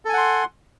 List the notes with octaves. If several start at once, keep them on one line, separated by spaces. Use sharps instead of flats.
A4 F#5 G#5 C6